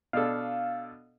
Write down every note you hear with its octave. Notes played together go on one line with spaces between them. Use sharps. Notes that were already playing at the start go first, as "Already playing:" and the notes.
B2 D4 A4 F5